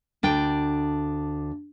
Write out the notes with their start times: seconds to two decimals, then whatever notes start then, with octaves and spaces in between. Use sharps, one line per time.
0.23 D2 D4 G5